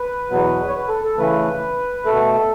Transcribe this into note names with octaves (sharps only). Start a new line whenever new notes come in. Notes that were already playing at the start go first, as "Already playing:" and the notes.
Already playing: B4
E2 B2 F#3 B3
C#5
B4
A4
A4
C#3 E3 A3 B4
B2 A3 A4